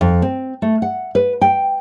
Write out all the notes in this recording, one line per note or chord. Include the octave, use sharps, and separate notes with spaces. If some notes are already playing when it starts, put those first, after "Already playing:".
F2
C4
A3
F#5
B4
G5